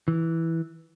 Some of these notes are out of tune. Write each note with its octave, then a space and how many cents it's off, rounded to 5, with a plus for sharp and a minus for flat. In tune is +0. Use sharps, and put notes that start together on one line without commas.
E3 -5